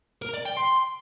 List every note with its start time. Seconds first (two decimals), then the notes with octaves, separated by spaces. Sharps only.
0.22 A#4
0.34 D5
0.45 G5
0.57 C6